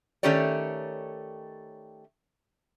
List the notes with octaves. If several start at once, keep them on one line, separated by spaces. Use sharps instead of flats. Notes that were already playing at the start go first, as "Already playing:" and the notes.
D#3 A3 C#4 G4 C#5 D5